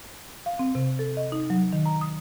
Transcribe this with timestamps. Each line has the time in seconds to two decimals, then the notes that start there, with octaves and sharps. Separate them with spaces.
0.46 F5
0.59 C4
0.75 C3
0.99 A4
1.17 D#5
1.32 D#4
1.50 F#3
1.72 D#3
1.86 A#5
2.01 D#6